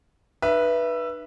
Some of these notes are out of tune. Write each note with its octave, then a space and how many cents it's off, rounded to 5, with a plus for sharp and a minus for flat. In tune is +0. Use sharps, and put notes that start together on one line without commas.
D#4 -40 B4 -15 E5 +15